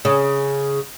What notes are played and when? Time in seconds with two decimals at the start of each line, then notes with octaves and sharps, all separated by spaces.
0.05 C#3